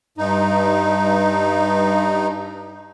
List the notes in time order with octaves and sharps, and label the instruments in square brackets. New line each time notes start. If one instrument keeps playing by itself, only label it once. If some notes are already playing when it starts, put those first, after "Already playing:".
[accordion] G2 D#4